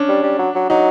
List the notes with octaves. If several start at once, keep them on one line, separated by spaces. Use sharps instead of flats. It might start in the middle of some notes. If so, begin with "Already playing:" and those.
Already playing: C#4 D4
G3
G3
F#3
F#3
F#3 D#4